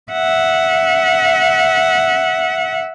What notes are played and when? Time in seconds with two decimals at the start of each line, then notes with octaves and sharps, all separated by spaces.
0.12 E5 F#5